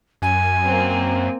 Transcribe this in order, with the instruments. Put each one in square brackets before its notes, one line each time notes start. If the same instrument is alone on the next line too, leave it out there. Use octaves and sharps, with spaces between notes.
[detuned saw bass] F#2 [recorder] G#5
[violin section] A#3 C4